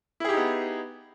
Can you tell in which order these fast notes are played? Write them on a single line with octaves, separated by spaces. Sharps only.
E4 G#4 G4 D#4 B3